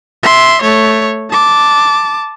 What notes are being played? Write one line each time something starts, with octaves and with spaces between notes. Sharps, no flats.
E5 C6
A3 C#5
A5 D6